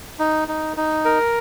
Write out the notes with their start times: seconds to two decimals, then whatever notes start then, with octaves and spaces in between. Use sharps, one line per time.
0.19 D#4
0.48 D#4
0.77 D#4
1.05 A#4